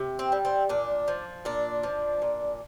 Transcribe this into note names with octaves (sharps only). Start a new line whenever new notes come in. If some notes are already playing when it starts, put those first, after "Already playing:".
Already playing: C3
C4
G3
C4
A#2 D4
F3
A#2 D4
F3
A#2